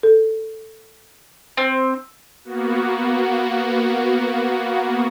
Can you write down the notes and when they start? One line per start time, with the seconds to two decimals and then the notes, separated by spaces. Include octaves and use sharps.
0.03 A4
1.57 C4
2.44 A#3 B3 F#4